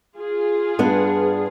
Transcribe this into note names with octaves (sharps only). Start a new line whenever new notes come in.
F4 G#4
G2 B3 D4